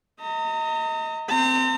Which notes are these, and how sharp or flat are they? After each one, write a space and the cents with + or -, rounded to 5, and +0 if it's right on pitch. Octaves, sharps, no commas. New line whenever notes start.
D#5 +25 A#5 -35
C4 -15 A#5 -45